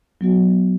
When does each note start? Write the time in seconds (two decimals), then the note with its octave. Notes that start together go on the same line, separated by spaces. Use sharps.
0.21 F#3 B3 F#4